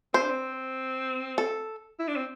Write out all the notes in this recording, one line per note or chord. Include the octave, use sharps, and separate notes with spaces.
C4 C5
D4
C4
A4
E4
D4
C4